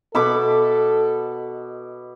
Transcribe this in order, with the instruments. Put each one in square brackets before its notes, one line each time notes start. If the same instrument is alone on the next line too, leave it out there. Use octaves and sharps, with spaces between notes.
[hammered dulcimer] B2 B5 D6 [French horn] A4